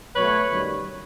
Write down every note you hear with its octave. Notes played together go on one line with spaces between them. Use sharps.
B2 F#3 A3 B4 C#5
F#2 D#3 G3